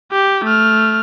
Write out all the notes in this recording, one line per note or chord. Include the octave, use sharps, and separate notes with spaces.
G4
A3 F6